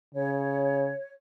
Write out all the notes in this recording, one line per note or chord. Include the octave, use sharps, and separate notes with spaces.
C#3 C#5